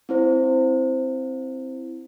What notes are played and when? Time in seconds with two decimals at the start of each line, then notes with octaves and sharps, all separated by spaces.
0.09 C4 E4 C5